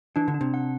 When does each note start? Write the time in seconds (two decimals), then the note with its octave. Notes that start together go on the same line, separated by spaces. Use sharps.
0.16 E3 D4
0.28 D3
0.34 D4
0.41 C3
0.54 F#5